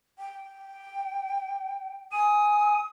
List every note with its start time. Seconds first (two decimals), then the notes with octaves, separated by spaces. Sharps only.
0.19 G5
2.12 G#5 D#6